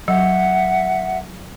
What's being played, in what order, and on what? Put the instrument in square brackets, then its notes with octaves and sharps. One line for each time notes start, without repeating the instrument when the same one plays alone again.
[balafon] F#3 [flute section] E5 F#5